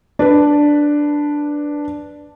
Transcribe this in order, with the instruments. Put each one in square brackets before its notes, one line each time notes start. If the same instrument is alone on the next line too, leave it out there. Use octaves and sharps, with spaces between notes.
[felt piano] D4 B4